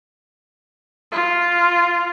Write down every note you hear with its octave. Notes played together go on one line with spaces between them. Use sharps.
F4